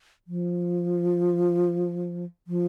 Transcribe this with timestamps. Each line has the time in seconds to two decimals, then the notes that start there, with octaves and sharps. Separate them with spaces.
0.27 F3
2.47 F3